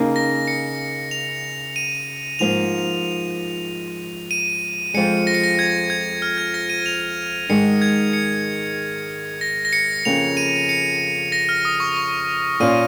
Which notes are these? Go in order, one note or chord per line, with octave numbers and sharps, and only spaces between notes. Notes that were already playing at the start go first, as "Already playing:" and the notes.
Already playing: C#3 A#3 D#4
A#6
C#7
F7
D#7
G#2 F3 A#3 F7
D#7
F2 F3 G#3 C#7
A#6
C#7
A#6
G#6
G#6
F6
G#6
A#6
D#7
F7
G#2 D#3 G#3 C#7
G#6
C#7
A#6
A#6
C#7
F2 C#3 A#3 F7
D#7
C#7
A#6
F6
D#6
C#6
C#6
A#2 A#3 C#4 F4 D#7